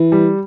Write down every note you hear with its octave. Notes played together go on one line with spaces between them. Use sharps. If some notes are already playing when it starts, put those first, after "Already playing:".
Already playing: E3
G3